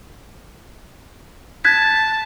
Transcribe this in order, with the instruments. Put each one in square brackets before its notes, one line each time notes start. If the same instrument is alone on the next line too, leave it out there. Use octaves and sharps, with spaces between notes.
[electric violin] A5 [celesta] F#6 G#6 B6